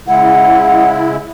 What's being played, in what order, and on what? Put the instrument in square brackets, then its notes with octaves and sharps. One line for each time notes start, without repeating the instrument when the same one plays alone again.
[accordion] C#3 G#3 E4 [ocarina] F#5